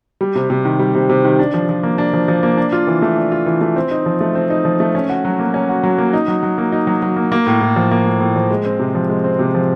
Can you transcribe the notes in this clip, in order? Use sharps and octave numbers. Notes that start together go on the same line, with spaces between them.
G3
C3
C3
D#3
G3
C3
C3
D#3
D4
F3
F3
A#3
D4
F3
F3
A#3
D4
F4
E3
A3
D4
F4
E3
A3
C4
D#4
F3
A3
C4
D#4
F3
A3
C#4
F#4
F#3
A#3
C#4
F#4
F#3
A#3
D#4
F#3
F#3
A#3
D#4
F#3
F#3
A#3
A#3
A2
A2
F3
A#3
A2
A2
F3
G#3
C4
C3
F3
G#3
C4
C3
F3